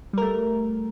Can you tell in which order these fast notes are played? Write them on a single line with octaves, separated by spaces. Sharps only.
G3 A#4 A3